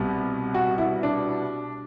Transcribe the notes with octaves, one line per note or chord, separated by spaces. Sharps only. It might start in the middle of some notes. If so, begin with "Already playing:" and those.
Already playing: C2 B2 G3 B3
F#4
E4
D4